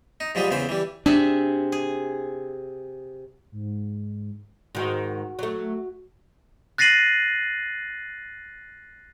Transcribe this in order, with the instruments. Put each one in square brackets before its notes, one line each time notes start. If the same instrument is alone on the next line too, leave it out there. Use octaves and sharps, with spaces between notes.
[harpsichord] D#4
G#2 F3 G3 G#4 B5
E2 C#3 E3 C5 B5
E3 G3
[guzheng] C3 G#4 E5 [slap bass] D4
[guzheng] G#4
[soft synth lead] G#2
[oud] G#2 D#3 [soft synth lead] F#4
[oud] F#3 A3
[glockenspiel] F#6 A6 A#6 C7 D#7 F#7